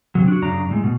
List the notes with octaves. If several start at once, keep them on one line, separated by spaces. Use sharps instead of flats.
C3 F#3
D4 F#4
F#2 C#3 D4 A#5
A2 G#3
B2